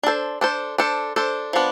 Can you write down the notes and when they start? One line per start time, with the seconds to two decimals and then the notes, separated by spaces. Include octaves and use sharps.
0.03 D4 A4 C5
0.41 D4 A4 C5
0.78 D4 A4 C5
1.16 D4 A4 C5
1.53 F3 B3 D4